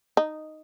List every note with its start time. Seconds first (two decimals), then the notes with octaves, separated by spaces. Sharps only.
0.17 D#4